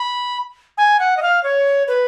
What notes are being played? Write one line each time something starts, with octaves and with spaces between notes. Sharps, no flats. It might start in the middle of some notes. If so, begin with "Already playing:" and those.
Already playing: B5
G#5
F#5
D#5
F5
C#5
B4